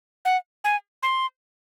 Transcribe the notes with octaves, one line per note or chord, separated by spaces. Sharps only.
F#5
G#5
C6